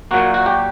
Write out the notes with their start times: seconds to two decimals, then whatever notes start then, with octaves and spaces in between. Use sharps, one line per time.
0.11 A#2 F#3 A#3 F#4
0.34 F#4
0.46 G4